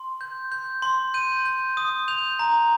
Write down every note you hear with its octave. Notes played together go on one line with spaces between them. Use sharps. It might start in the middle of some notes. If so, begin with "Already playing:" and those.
Already playing: C6
G6
G6
C6
G6 D#7
G6
D#6
G6 F7
A#5